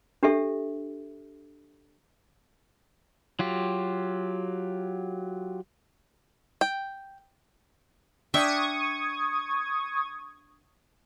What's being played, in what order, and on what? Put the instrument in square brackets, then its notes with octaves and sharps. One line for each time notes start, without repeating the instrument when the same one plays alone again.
[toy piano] D4 G4 A4 E5
[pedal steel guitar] F#3 F4 G4
[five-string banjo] G5
[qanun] D4 E5 G5 [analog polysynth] C#6 D#6 G#6